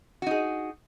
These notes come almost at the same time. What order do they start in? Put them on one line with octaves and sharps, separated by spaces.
F#4 D#4 G#4